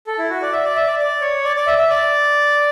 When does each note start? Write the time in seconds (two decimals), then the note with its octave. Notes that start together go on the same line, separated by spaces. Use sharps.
0.07 A4
0.18 E4
0.30 F#4
0.42 D5
0.53 E5
0.65 D5
0.76 E5
0.87 D5
0.99 D5
1.21 C#5
1.44 D5
1.56 D5
1.67 E5
1.78 E5
1.90 D5